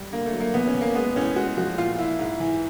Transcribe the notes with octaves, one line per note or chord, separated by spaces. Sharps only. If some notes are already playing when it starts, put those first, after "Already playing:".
Already playing: G3
D3 A#3
A3
F#3
A#3
E2 B3
C#4
E2
A#3
G#3 B3
A2 C#4
G#3 F#4
F3 F#4
A#2 F4
A#2 E4
G#2
E3